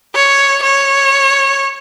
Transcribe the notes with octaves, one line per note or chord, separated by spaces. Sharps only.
C#5
C#5